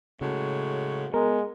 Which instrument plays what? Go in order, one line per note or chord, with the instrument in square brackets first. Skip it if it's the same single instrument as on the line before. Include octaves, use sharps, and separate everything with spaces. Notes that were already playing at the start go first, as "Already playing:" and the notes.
[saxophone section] A2 F#3 G#3 [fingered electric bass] C#3
[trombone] G#3 [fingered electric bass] B3 [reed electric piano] A#4